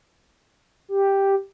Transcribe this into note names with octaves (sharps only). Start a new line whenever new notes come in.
G4